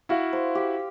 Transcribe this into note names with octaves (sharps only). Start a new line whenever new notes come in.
E4 F#4 F5
C5
G4